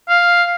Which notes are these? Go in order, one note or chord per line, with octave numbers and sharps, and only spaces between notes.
F5